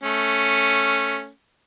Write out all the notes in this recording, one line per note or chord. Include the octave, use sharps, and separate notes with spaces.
A3 C#4